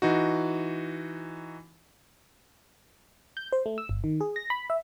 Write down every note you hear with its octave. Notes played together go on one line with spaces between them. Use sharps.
E3 D#4 F#4
G6
C5
A3
E6
G1
D#3
G#4
A#6
B5
E5